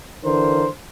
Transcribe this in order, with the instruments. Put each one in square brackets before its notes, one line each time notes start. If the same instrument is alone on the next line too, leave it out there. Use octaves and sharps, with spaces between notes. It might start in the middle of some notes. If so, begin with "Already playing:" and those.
[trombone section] D3 E3 A#4 C5